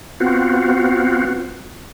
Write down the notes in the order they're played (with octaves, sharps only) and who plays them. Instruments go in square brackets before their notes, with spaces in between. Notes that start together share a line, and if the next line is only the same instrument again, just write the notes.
[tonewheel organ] B3 C4 F4 F#4